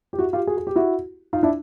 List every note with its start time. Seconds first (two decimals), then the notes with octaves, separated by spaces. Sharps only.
0.13 G4
0.19 E4 F#4
0.33 F4 G4
0.47 F#4 G#4
0.57 G#4
0.67 G4
0.76 E4 F#4
1.33 D#4 F4
1.43 D4 E4